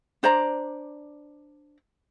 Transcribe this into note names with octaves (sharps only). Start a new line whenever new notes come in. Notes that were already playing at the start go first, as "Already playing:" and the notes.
D4 C5 D5 A#5